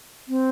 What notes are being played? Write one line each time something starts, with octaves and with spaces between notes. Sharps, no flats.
C4